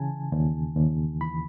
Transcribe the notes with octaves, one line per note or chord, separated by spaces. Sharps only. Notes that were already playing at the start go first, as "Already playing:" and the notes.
Already playing: C#3 E3 G#5 A5
D#2
D#2
E3 B5